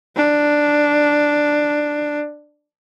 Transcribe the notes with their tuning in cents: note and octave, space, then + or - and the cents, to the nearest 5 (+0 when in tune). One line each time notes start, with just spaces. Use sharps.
D4 +5